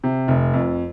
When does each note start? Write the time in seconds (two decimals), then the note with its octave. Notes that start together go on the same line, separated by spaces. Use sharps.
0.04 C3
0.28 F1
0.53 F2